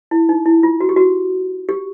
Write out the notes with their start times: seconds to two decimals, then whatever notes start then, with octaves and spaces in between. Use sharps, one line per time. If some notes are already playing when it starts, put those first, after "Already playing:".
0.11 E4
0.29 D#4
0.46 E4
0.63 F4
0.80 F#4
0.89 G4
0.96 F#4
1.69 G4